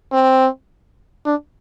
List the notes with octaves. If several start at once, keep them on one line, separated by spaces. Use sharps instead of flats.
C4
D4